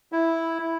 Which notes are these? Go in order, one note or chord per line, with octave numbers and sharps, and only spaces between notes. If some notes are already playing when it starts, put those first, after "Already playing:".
E4